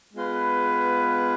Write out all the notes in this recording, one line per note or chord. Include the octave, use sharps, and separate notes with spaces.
G#3 B3 F4 B4